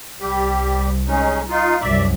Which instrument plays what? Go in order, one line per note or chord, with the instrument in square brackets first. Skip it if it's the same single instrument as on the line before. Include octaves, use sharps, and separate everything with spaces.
[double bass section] C2 [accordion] G3 G4
[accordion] G#3 C#4 D#4
D#4 F4
[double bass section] C2 F#2 F#3 [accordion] D5 E5